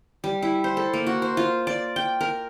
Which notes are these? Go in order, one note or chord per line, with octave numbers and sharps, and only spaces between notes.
G3
E4
C5
A4
A#3
F#4
C5
F4
D5
G5
A#4